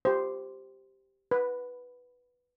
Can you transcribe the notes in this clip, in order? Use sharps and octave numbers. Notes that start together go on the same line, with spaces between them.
G4 C5
B4